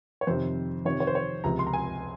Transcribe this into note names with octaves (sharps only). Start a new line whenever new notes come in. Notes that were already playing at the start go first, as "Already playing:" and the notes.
C#5
F2 C3 D#3 C5
F2 C3 D#3 C#5
C#5
C5
C#5
C#2 C3 F3 A#5
C6
A#5
G#5